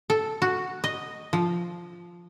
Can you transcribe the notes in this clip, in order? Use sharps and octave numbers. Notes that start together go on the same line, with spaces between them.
A4
F#4
D#5
F3